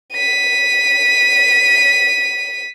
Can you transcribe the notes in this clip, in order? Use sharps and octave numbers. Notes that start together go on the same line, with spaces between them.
B6 D#7